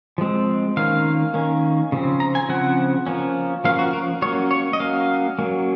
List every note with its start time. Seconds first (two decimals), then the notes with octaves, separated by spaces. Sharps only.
0.18 F3 G#3 C4
0.77 D#3 A#3 C#4 F5
1.34 D#3 A#3 C#4
1.92 C#3 F3 C4
2.20 A#5
2.35 G#5
2.49 C#3 F3 C4 F#5
3.07 F3 A#3 C#4
3.64 F3 A#3 C#4 F5
3.79 F#4
3.93 A#4
4.22 F#3 A#3 C#4 C#5
4.51 C#5
4.73 D#5
4.80 F#3 A#3 C#4 F5
5.39 F#3 A#3 C#4